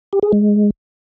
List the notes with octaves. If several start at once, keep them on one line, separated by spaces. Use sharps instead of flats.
G4
G#4
G#3